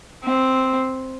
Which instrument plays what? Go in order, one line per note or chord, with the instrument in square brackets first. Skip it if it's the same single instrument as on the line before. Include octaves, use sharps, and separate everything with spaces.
[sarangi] C4